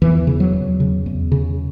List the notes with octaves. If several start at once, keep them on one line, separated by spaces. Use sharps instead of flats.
E2 E3
C#3
F#3
E2
C#3
E2
C#3